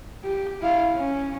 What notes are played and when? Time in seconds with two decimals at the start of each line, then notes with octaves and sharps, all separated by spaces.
0.24 G4
0.61 E4 F5
0.95 C#4